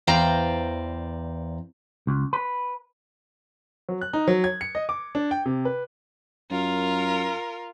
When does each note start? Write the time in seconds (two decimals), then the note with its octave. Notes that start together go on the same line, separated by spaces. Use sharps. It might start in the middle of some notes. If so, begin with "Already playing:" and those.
0.07 E2 C5 D5 F5 G5 A#5
2.07 C#2
2.33 B4
3.89 F#3
4.01 F#6
4.13 D#4
4.28 F#3
4.44 G#6
4.61 C#7
4.75 D#5
4.89 D6
5.15 D4
5.31 G5
5.46 C3
5.65 B4
6.51 F#2 F4 A#4